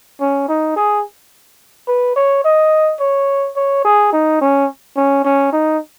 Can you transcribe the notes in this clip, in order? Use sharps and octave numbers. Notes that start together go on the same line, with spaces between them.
C#4
D#4
G#4
B4
C#5
D#5
C#5
C#5
G#4
D#4
C#4
C#4
C#4
D#4